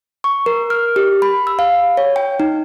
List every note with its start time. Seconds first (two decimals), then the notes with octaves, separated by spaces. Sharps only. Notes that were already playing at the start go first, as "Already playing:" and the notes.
0.24 C#6
0.46 A#4
0.70 F6
0.96 G4
1.22 B5
1.47 E6
1.59 F5
1.97 C#5
2.16 G5
2.40 D#4